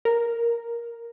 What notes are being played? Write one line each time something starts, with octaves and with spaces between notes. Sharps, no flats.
A#4